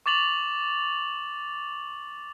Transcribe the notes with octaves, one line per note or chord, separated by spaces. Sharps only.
C#6 D6 A6 F7 F#7